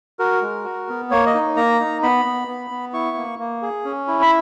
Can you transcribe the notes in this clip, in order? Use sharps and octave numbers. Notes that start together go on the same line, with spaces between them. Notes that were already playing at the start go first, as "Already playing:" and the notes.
F#4 A#4
G#3
F#4
B3
A#3 C#5
D#5
D#4
A#3 A#5
D#4
B3 B5
B3
B3
B3
E4 C#6
A#3
A#3
G#4
C#4
E4
B5